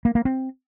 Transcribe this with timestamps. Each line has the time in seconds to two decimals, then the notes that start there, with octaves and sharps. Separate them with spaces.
0.05 A#3
0.15 A#3
0.25 C4